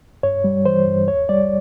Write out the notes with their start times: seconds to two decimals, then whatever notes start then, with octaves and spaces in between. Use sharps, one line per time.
0.23 G2 C#5
0.44 G3
0.65 E3 C5
0.87 G2
1.08 D#2 C#5
1.29 G3 D5